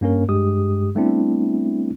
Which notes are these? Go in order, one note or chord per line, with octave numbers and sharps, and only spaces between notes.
G2 A#3 C#4 A#4
G2 G#3 G4 D#6
G3 A3 B3 C4 D4 E4